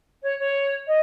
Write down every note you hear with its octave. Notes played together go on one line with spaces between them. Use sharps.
C#5
C#5
D#5